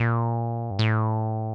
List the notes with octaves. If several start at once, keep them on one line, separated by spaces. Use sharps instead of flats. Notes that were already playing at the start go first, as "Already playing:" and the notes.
Already playing: A#2
G2
A2